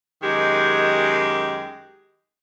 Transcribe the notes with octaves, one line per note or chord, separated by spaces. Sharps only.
F#2 D#3 G#3 G4